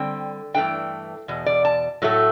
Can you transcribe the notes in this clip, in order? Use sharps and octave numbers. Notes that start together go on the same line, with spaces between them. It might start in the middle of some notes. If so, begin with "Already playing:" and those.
Already playing: D3 G3 C4 G5
G2 E3 A3 D4 G5
E2 B2
D5
A5
A2 F#3 A3